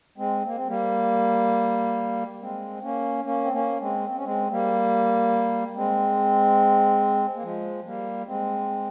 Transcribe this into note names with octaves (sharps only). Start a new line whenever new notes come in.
G#3 C4
A#3
C4
G3 A#3
G#3 C4
A#3 C#4
A#3 C#4
C4
A#3 C#4
G#3 C4
C4
C#4
G#3 C4
G3 A#3
G#3 C4
A#3
F3 G#3
G3 A#3
G#3 C4